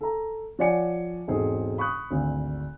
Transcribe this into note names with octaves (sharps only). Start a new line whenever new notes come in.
A4 A#5
F3 C#5 D5 F#5 G#5 C#7
E1 G#2 C4 G#4 A4
B5 C#6 D#6 F#6
G#1 D2